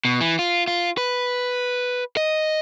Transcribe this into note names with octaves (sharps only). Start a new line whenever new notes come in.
B2
E3
F4
F4
B4
D#5